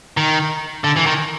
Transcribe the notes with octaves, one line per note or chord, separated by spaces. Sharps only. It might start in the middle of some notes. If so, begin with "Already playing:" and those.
D#3
D3
E3
D#3